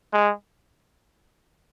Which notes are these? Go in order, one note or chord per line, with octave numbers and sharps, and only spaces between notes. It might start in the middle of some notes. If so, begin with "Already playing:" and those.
G#3